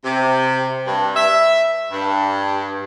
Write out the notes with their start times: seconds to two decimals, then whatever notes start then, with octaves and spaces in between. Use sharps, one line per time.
0.05 C3
0.87 G2
1.16 E5
1.91 G2